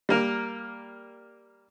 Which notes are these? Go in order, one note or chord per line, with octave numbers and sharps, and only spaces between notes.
G3 A#3 A#4